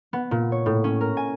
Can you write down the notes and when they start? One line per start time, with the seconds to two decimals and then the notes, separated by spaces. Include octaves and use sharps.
0.13 B3
0.31 A#2
0.52 C#5
0.66 A2
0.84 C#4
1.01 A#4
1.17 G#5